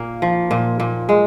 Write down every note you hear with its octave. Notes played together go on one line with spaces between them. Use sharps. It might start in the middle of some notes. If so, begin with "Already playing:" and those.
Already playing: A#2 A#3
F3
A#2
A#2
G#3